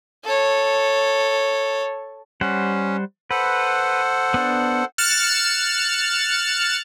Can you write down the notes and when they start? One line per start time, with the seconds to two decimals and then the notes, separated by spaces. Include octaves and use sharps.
0.24 A4 C#5
2.41 G3 C#4 C5 F#5
3.31 A4 B4 C5 F#5
4.34 B3 D4
4.98 F6 F#6 A6 C#7 E7